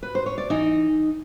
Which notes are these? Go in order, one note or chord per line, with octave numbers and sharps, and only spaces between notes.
B4
C5
C#5
D5
E3 D#4 D#5